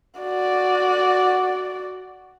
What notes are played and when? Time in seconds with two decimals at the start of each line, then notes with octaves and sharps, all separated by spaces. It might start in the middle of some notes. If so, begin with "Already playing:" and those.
0.21 F#4 D5